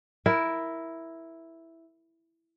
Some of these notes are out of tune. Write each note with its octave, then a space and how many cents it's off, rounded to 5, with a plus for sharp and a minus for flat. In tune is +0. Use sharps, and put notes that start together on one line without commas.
E4 +0 A#4 +0